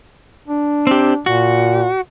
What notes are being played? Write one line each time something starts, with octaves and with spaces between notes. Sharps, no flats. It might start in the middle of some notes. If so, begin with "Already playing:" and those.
D4
C4 G4
A#2 F#4